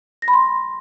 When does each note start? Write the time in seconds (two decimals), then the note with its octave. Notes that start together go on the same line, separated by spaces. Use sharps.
0.22 A#6
0.28 B5
0.33 C6